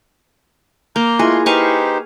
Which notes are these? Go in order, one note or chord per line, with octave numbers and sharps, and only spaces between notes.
A#3 A#5 F6 G6
G#3 A3 E4 F4 G#4 C6
D#4 G4 B4 C5 F5 G#5 C#6